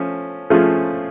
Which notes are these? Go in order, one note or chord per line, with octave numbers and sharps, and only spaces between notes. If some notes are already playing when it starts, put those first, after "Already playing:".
Already playing: F3 A3 C#4
F3 A3 C#4 F4 G#4